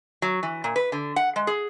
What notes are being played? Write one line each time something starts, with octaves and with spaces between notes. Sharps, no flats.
F#3
E3
A#2
B4
D3
F#5
G#3
G#4